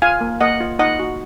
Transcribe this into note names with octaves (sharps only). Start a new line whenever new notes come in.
F4 F5 G#5
A#3
A#3 D#5 F#5
F4
D#4 D#5 F#5
F#4